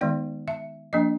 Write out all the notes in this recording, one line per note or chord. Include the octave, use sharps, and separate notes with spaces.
D#3 G#3 B3 D#4 D5
E5
F3 A#3 D4 D#5